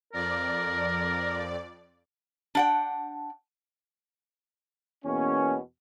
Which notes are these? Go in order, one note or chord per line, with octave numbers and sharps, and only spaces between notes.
F2 A#4 D5
D4 F#5 G5
E2 B2 A#3 C#4